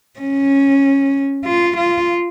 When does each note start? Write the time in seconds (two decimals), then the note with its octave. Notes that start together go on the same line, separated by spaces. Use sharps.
0.20 C#4
1.45 F4
1.77 F4